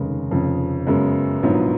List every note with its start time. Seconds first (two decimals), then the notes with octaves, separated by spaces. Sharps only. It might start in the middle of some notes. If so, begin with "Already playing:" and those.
Already playing: F1 D#2 C#3 G#3
0.31 F1 F2 C#3
0.86 F#2 C#3 G#3 B3 F#4
1.42 A#1 G#2 F#3 B3 F4